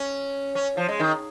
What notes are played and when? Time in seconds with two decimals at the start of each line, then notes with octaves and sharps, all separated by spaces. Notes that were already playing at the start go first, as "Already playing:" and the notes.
Already playing: C#4
0.55 C#4
0.77 F3
0.88 G#3
1.00 D#3